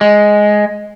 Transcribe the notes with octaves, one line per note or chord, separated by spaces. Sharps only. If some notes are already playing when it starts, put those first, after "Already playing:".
G#3